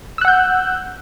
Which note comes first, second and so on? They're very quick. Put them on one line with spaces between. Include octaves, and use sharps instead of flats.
E6 F#6 F#5 G6